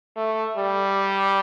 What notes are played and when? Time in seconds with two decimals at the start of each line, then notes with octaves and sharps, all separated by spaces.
0.17 A3
0.57 G3